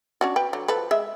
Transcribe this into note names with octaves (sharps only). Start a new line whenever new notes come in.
C#4 D4 F#4
B4 G5
D3 F#3
F3 A4 B4
G#3 E5